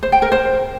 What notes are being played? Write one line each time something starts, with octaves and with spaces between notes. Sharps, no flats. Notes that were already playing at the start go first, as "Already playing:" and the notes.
C5
G5
A#4
C5